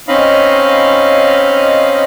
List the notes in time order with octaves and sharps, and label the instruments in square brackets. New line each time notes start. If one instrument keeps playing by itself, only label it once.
[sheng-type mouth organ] C4 C#4 D#4 D#5 F5 B5